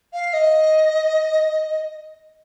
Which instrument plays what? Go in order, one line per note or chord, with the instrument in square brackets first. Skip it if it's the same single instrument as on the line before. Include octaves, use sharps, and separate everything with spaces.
[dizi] F5
D#5